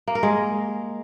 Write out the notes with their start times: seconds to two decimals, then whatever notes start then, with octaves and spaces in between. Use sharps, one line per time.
0.07 A#3
0.15 A#4
0.23 G#3